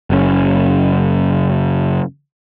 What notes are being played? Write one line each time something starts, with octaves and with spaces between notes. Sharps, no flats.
F#1 A2 C#4